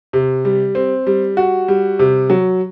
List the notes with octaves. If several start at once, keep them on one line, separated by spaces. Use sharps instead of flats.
C3
G3
C4
G3
F#4
G3
C3
F#3